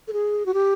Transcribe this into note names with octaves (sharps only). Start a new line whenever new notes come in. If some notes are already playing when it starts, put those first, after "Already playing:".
A4
G#4
F#4
G4